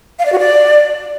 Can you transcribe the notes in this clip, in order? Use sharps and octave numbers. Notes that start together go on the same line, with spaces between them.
F5
D5
F#4
D5